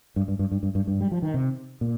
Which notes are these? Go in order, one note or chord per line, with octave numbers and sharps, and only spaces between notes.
G2
G2
G2
G2
G2
G2
G2
G3
F3
D#3
C3
A#2